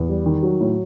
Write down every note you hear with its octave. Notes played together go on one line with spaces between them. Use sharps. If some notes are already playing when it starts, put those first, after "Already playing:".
Already playing: E2
G3
D#3
F#3
A2